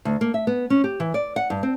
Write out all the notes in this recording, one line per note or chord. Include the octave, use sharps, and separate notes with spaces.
D2
A#3
E5
B3
C#4
G4
E3
D5
F#5
G2
C4